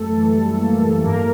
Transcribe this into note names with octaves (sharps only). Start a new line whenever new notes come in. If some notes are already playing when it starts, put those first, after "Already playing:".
Already playing: F#2 A3 A4
E3
G3
A#3
A2
G2 A#3 A#4